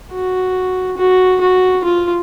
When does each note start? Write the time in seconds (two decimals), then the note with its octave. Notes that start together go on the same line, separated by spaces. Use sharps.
0.13 F#4
0.97 F#4
1.41 F#4
1.84 F4